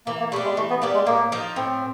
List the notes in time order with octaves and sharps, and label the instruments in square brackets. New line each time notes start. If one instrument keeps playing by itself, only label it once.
[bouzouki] E3 [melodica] A#3
[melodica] A#3
[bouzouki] G3 B3 D4 [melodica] A3
[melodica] G#3
[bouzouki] E3 [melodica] A3
[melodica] B3
[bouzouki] G3 B3 D4 [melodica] A#3
[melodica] G#3
[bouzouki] A2 [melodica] A#3
[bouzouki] F3 A#3 D#4
[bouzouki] A2 [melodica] C4